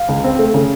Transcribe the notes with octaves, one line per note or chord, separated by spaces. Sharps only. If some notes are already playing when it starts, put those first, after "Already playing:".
Already playing: F5
C#2
C4
A3
C#3